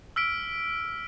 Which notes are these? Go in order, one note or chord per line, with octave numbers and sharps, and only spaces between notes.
E6 F6 B6 D7